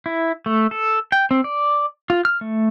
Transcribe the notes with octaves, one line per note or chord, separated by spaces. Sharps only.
E4
A3
A4
G5
C4
D5
F4
F6
A3